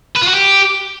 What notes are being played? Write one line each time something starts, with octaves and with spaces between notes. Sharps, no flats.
B4
F4
F#4
G4